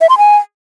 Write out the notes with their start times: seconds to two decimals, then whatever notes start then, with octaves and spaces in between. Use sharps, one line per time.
0.01 E5
0.10 C6
0.18 G#5